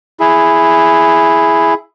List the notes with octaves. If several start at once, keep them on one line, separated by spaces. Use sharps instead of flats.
E4 G#4